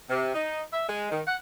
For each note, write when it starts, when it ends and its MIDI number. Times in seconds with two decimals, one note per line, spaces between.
0.10 0.33 48
0.35 0.62 63
0.73 0.85 76
0.89 1.08 56
1.11 1.21 51
1.27 1.36 78